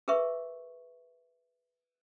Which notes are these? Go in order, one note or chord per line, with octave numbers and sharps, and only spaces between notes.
G#4 A#4 B4 E5 C#6